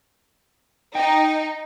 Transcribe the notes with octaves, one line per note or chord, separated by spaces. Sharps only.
D#4 G5